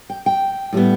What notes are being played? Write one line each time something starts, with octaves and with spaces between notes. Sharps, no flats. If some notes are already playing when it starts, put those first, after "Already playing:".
G5
G5
A2 G3 B3